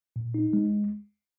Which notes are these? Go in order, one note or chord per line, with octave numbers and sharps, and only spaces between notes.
A#2
D#4
G#3